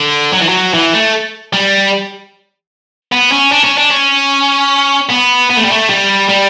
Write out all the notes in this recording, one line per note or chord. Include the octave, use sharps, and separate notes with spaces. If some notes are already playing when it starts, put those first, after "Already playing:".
Already playing: D3
F#3
E3
F#3
E3
A3
G3
B3
C#4
D4
C#4
D4
C#4
B3
B3
A3
G3
A3
G3
G3